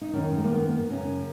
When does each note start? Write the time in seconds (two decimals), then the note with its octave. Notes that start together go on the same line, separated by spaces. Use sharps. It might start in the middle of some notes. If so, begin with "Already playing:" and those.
0.01 D#4
0.13 F#2 D#3 C#4
0.37 G#3
0.44 A#3
0.52 B3
0.90 F#2 C#3 C#4